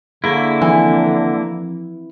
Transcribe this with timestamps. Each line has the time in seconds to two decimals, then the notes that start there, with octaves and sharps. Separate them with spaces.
0.24 D3 A#3 E4 G#4 C#6
0.62 E3 F3 C4